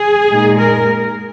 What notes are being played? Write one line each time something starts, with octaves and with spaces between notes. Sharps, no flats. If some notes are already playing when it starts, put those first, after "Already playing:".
Already playing: G#4
A#2 G#3 D#4
A#4